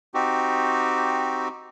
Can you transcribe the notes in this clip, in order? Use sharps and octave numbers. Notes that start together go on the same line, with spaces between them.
C4 D#4 F#4 G4